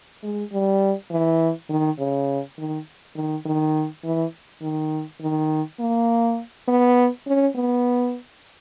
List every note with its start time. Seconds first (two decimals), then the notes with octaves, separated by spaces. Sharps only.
0.23 G#3
0.52 G3
1.10 E3
1.70 D#3
1.99 C#3
2.58 D#3
3.16 D#3
3.45 D#3
4.04 E3
4.62 D#3
5.21 D#3
5.80 A#3
6.68 B3
7.27 C#4
7.56 B3